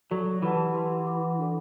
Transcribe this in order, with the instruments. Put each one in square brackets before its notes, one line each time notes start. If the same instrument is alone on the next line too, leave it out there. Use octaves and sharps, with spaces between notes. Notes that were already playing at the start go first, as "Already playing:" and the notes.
[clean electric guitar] F#3 [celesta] F#4 A4 D5
[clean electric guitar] E3 [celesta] G4 B4 F#5 A5
[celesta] G4 B4 F#5 C6
B4 F#5 B5 D6
D4 F#4 A4 D5